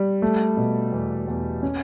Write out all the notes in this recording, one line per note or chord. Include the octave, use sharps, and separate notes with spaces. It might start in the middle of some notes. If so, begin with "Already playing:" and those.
Already playing: G3
A3
B2
E2
E2
C#4